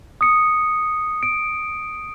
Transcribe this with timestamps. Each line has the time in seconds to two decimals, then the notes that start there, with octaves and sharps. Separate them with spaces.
0.21 D#6 C#7
1.23 D7